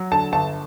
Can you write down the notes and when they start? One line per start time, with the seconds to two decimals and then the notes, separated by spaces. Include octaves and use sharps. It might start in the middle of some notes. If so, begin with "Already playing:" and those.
Already playing: F#3
0.12 D3 A5
0.32 G1 A5